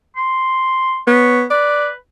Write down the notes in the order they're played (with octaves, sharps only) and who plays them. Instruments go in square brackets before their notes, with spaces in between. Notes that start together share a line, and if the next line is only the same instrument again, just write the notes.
[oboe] C6
[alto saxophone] B3 [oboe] C#5
[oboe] B4 [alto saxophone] D5